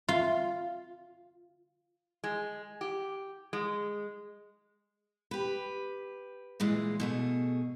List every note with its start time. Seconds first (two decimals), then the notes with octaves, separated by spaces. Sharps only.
0.09 F4
2.24 G#3
2.81 G4
3.53 G#3
5.31 G4 B4
6.60 A#2 E3 G#3
7.00 B2 A3 G#4